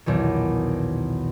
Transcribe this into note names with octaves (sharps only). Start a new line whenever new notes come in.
B1 E2 A#2 D#3